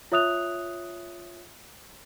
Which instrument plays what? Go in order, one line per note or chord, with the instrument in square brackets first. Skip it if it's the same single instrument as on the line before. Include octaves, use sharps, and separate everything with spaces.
[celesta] F4 C#5 E5 D#6 F#6 F7